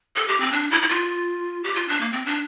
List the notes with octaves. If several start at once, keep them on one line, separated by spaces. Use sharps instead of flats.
A4
G4
C4
D4
E4
E4
F4
G4
F4
D4
A#3
C4
D4